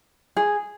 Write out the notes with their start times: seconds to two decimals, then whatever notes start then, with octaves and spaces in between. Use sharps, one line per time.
0.37 G#4